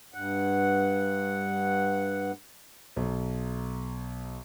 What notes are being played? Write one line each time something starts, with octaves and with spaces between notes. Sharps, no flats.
G2 F#5
B1